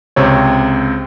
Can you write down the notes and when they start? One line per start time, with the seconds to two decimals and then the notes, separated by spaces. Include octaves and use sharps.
0.16 C#2 C3 C4 C#5